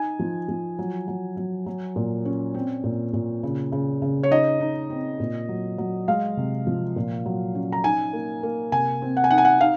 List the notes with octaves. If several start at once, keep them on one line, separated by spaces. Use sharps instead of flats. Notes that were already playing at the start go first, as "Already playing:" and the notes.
Already playing: D#4 G#5
F3
F3
F#3
F#3
F#3
F#3
A#2
C#4
C4
A#2
A#2
C#3
C#3
C#3
C#5
D#4 D#5
D#4
C4
A#2
F#3
F#3
G#3 F5
C3
F3
A#2
F#3
C#4
A#5
D#4 G#5
A#3
A#3
C3 G#5
C4
F#5
G#5
D#4 F#5
G#5
F#5
D#4 F5